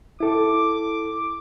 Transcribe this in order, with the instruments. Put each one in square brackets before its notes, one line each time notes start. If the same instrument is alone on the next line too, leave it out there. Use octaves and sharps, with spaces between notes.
[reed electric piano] E4 A4 [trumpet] D6